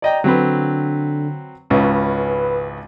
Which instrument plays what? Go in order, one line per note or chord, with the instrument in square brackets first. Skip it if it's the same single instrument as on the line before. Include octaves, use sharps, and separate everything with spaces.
[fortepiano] D5 D#5 G5 [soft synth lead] A#5
[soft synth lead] D3 [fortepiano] F#3 C4 B4
[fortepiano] G#1 C#2 C#4 [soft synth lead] B4